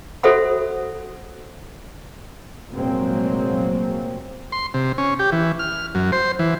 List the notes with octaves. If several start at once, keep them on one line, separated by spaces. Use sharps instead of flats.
F#4 A4 C5 E5 F#5 B5
F1 A#2 F#3 G#3 A#3 C4
C6
C3
C#4
G4
E3
F6
F#2
C5
E3